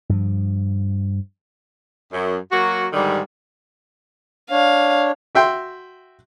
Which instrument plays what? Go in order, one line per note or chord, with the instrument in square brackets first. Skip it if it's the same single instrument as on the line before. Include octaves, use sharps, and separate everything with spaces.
[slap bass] G2 F3
[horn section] F#2
F#3 A#3 F#4
G#2 D3 D#3 G3
[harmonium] D4 C#5 [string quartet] F5
[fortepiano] F#4 E5 G5 C6